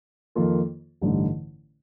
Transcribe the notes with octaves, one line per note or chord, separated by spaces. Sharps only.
F2 D#3 A#3 F4 A4
A1 G2 D3 A3 D#4